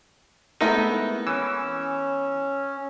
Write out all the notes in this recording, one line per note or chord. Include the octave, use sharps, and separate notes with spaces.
G#3 A3 B3 C4 D#4 E4 A#4
E3 C#4 E6